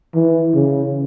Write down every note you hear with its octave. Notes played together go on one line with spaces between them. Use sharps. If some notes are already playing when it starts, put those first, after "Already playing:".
E3
C#3